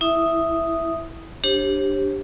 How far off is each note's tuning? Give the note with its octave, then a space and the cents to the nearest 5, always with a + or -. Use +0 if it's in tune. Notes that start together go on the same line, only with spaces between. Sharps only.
E4 +0 E5 +0 D#6 +0
D4 +0 G4 +0 C5 +45